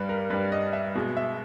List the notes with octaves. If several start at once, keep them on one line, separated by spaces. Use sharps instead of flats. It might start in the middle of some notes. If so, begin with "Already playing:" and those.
Already playing: G2 G3 B4
A#4
G2 G3 B4
D#5
E5
B2 G#3
E5